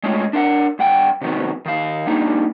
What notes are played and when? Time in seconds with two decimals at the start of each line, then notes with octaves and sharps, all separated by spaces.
0.03 G#3 A3 C#4 F4
0.33 D4 A#4 F5 F#5
0.79 G2 F#5 G5
1.21 C3 D#3 F#3 B3
1.66 D#3 F5
2.07 G3 A#3 D4 D#4